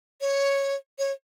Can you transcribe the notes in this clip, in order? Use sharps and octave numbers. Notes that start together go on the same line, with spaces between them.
C#5
C#5